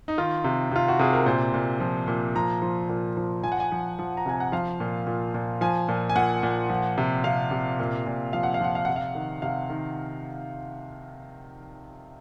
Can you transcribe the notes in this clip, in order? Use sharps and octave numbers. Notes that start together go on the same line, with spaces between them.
D#4
D#3 F4
C3
C3 F4
F#4
C3 G#4
A#4
A#2 C5
A#2
F3
A#2
F3 A#5
F3
A#2
F3
F3 G#5
F#5
G#5
F3
F3
A#5
C3 G#5
F#5
F3 F5
A#2
A#2
A#2
F3 G#5
A#2
G#5
A#2 F#5
A#2
F3
C3
C3 F5
C3
A#2
A#2
F3 F5
F#5
F5
F3 F#5
F5
C3 F#5
F5
D#3
C3 F5
D#3